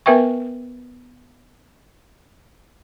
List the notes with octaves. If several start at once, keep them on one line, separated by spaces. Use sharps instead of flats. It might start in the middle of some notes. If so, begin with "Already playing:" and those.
B3 A#4 B4 E5 G5 C#6